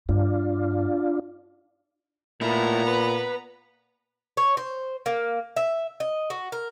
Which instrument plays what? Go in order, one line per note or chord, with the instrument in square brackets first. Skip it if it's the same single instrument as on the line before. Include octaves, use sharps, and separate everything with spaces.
[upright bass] G2 [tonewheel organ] D4 F4
[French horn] A#2 [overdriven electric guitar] A3 E4 [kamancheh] B3 A#5
[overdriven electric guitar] B4
[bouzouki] C#5
C5
A#3
E5
D#5
F#4
A#4